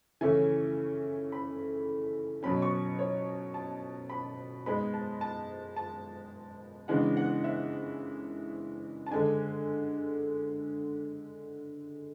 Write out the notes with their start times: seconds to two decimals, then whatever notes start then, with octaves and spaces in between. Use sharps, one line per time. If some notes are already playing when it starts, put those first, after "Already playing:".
0.21 C#3 E3 A3 C#4 E4 G#5
1.32 B5
2.43 B2 F#3 C#4 B5
2.62 C#6
2.99 C#5
3.54 A5
4.10 B5
4.66 G#2 G#3 B3 B5
4.94 A5
5.21 A5
5.76 A5
6.88 C#3 E3 G#3 B3 D4 F#5
7.17 F#5
7.44 E5
9.07 A5
9.11 D3 G#3 D4 G#5